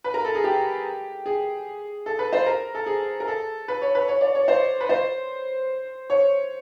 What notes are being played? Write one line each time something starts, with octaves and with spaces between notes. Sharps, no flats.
B4
A#4
A4
G#4
G4
G#4
A4
B4
C5
A#4
A4
G#4
A#4
A4
B4
C#5
B4
C#5
D5
C#5
C5
B4
C5
C#5